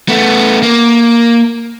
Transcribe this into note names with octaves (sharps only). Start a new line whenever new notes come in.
A3 B3
A#3